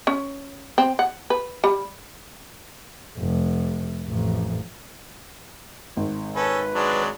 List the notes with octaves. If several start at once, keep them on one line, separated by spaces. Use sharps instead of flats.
C#4
C4
F#5
B4
G3
F1
A1 F2
G#1
C#4 A4 B4
F#3 G#3 D4